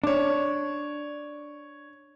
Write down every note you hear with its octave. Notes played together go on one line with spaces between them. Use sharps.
D4 C#5 D6